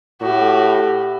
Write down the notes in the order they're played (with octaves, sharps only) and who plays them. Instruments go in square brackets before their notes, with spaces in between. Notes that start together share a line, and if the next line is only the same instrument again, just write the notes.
[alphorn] A2 [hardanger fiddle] F#4 G4